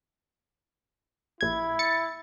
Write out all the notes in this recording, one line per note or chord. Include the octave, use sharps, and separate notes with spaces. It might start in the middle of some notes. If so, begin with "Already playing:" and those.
A#1 E4 G#6
A6 C#7